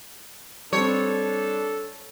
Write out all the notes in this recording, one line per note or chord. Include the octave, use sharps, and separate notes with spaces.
G3 C4 D4 A4 C#5